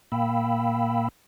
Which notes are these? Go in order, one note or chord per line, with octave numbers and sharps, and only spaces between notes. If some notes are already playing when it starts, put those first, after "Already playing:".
A#2 A#3 F5 G5 B5 E6